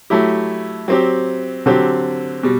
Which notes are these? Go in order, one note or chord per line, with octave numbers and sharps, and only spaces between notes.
F#3 A3 E4 G4
F#3 C4 G4
D3 F#3 C4 G4
B2 G3